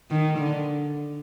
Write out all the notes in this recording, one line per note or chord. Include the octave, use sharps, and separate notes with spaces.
D#3
D3